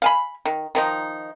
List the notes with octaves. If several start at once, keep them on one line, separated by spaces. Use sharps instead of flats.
F5 G#5 B5
D#3
D#3 F3 D#4